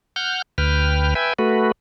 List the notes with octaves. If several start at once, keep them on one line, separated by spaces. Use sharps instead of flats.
F#5 F6 G6
D2 B4 G5 F6
B4 E5 G5 G#5
A3 F#4 B4